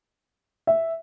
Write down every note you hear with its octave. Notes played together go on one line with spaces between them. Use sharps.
E5